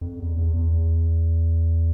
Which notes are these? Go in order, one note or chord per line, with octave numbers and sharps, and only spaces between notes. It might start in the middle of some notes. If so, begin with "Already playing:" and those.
F2
E2
E2
E2